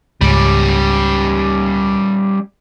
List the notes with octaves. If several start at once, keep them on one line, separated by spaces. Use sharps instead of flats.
C#2 G#2 G3 C#4